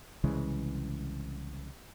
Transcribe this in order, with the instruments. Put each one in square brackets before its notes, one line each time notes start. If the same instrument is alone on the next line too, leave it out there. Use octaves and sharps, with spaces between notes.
[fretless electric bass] C2 C#3 E3 G#3